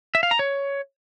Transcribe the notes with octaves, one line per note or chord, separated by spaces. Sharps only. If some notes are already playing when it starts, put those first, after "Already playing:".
E5
F5
A#5
C#5